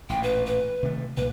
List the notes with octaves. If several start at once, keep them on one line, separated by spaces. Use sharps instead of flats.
A1 A#2 G5
B4
B4
C3 D#3 A3
C2 A#2 B4